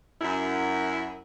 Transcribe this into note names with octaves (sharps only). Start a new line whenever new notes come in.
F#2 E4